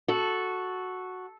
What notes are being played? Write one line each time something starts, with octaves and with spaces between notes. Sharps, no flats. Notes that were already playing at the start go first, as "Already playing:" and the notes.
F#4 A4